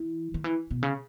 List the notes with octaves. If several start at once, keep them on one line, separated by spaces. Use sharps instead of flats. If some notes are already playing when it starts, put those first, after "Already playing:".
Already playing: E3
D#3
E3
B2
C#3